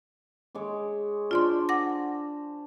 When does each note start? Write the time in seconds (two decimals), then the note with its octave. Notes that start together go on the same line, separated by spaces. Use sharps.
0.55 G#3 C#5 D6
1.31 D4 F4 C5 D5 C6
1.69 F#5 D6 A#6